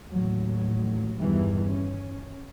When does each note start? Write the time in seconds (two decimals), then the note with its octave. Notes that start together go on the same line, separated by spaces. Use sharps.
0.11 A1 D#2 A2 F#3
1.17 G1 E2 G2 D#3 E3 G3
1.68 C#4